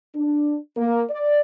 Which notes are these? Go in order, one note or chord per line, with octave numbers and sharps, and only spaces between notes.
D4
A#3
D5